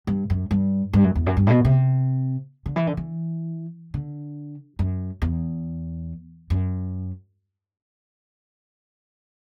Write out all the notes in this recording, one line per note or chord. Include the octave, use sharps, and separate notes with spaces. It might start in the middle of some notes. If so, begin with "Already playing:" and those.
G2
F#2
G2
G2
F#2
E2
F#2
G2
A2
B2
C3
D3
E3
D3
E3
D3
F#2
E2
F#2